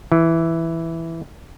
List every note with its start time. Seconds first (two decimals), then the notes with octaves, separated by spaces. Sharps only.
0.12 E3